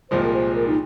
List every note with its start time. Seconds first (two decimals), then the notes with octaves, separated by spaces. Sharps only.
0.10 C2 A#2 F3 G#3 C5
0.23 A#4
0.33 C5
0.55 A#4
0.67 D#4